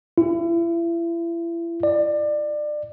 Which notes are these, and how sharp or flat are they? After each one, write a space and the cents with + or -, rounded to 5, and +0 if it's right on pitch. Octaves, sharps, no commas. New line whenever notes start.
E4 +35
D5 +25